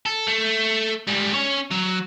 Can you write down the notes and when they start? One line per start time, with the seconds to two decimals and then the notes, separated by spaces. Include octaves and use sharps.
0.06 A4
0.27 A3
1.08 G#2 G3
1.34 C#4 C#5
1.71 F#3